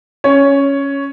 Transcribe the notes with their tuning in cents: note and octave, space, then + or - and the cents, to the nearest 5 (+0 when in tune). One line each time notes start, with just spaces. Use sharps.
C#4 +0 C#5 +10